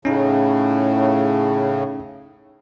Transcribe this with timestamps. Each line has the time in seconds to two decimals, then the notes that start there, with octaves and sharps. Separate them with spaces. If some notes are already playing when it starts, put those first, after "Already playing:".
0.05 A2 C#3 C#4 D#4